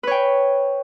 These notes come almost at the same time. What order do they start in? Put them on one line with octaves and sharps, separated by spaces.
B4 C#5 G5